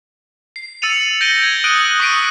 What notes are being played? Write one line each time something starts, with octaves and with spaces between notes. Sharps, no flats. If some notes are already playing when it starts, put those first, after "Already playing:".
C7
E6 A6 C#7 D#7 F7
G6 A#6 D7 D#7 G7
G#6
D#6 F#6 D7 D#7 F#7 G7
C#6 D#6 B6 C7 D7 D#7